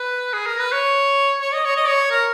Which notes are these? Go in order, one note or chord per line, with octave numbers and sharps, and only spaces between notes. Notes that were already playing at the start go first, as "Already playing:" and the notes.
Already playing: B4
G#4
A#4
B4
C#5
C#5
D#5
C#5
D#5
C#5
A#4